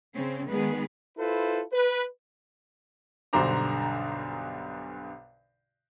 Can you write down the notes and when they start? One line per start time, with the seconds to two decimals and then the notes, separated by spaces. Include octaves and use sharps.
0.12 C#3 C4 C#4
0.49 D#3 G#3 B3 G#4 B4
1.18 E4 F4 A4 B4 C5
1.73 B4
3.33 B1 G2 D3 C5 A#5 D6